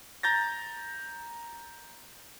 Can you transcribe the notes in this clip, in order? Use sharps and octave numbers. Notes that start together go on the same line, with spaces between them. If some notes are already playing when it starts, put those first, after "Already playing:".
A#5 G6 A6 A#6